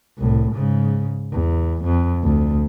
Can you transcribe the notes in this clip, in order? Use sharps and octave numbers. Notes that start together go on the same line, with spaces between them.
C2 A2
G#2 C#3
E2
F2
D2